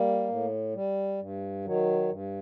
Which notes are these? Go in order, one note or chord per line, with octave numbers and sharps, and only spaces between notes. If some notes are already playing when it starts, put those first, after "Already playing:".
Already playing: G3 A#3
A2
G3
G2
D#3 F#3
G2